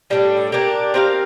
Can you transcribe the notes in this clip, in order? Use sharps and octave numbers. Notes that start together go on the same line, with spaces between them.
A2 G3 D4 A4
A#3 D4 G4 A#4
C4 G4 A#4 F5